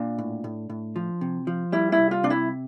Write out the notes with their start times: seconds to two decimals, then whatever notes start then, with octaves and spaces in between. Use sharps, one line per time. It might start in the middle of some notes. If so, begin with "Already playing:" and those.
Already playing: A#2 D4
0.18 A2
0.44 A2
0.70 A2
0.96 F3
1.21 C3
1.47 F3
1.72 G3 E4
1.92 E4
1.98 C2
2.11 F4
2.23 C3 D4
2.30 E4